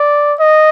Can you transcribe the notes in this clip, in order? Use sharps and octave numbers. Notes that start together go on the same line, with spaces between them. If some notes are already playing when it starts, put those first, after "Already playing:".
Already playing: D5
D#5